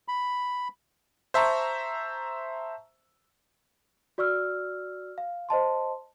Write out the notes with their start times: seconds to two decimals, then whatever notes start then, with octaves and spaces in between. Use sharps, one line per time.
0.08 B5
1.34 C5 E5 A5 A#5 C#6
4.18 F#4 D5 C#6 E6 F6
5.18 F5
5.49 C5 D#5 A5 C6